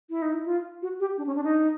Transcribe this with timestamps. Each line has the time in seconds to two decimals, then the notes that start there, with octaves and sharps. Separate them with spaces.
0.10 E4
0.22 D#4
0.34 E4
0.46 F4
0.82 F#4
1.00 G4
1.18 D4
1.27 C#4
1.35 D4
1.44 D#4